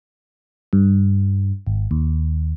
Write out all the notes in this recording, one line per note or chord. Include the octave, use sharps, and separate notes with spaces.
G2
G#1
D#2